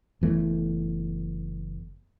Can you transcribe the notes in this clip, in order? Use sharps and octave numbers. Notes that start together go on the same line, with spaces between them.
F#1 E3 A3 B3